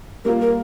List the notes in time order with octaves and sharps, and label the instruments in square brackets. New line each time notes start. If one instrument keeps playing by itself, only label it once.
[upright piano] G3 A#3 F4 [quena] A#4
[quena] A#4